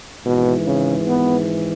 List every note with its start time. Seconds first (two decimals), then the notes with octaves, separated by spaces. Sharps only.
0.25 G#1 G#2 B2 E3
0.66 C#3
1.08 B3